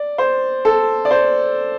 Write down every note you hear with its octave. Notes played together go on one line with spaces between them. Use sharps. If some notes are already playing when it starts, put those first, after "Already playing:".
Already playing: D5
C5
A4
D5
C5